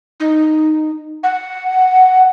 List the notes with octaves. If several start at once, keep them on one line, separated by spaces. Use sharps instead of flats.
D#4
F#5